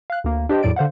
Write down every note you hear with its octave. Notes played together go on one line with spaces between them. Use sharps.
F5 F#6
D2 A#3
D4 G4 C5 D#5 G5
E2 A2 F#3 D5 D7
D3 C5 F5 F#5